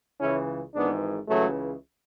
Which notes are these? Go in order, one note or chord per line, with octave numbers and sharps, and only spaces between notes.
C#2 C#3 E3 C#4 E4
G#1 G#2 E3 B3 D4
C#2 C#3 E3 F#3 A3